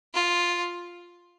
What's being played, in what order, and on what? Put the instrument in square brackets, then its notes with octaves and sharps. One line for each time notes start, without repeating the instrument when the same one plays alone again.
[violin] F4